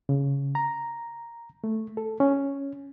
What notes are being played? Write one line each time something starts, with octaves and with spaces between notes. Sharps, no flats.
C#3
A#5
A3
A4
C#4